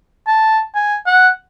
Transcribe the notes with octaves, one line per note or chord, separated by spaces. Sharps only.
A5
G#5
F#5